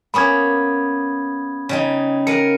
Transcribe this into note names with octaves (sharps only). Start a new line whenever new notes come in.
A#3 B3 C#4 B5 D#6 G#6
C#3 G3 D#4
A#4 F5 F#5 C#7 D#7